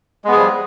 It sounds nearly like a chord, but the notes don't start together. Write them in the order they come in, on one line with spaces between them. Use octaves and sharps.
G#3 B3 G#4 F3 G3